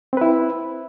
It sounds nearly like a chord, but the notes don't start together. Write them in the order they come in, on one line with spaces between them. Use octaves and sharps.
C4 B4 E4